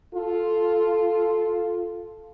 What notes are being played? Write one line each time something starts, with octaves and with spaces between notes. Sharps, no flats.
F4 A4